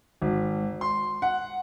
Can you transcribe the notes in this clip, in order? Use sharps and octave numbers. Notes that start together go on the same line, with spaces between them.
G#1
C6
F#5